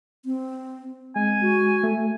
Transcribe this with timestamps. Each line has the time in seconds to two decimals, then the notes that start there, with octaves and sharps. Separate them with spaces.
0.25 C4
1.16 G#3 C4 G#5
1.41 F#4
1.83 A3